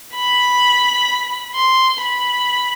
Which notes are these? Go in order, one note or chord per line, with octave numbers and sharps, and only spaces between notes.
B5
C6
B5